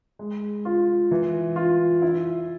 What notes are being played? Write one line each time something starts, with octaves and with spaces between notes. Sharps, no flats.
G#3
F4
E3
F4
E4